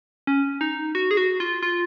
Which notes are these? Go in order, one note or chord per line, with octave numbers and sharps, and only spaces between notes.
C#4
D#4
F#4
G#4
F#4
F4
F4